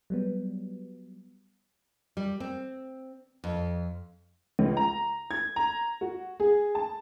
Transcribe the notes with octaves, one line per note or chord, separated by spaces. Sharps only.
F#3 G3 B3
G3
C4
F2
C#2
A#5
G#6
A#5
F#4
G#4
A5